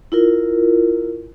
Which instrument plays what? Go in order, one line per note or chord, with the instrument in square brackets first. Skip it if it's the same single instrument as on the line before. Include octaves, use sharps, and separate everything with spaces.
[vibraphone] E4 F4 A#4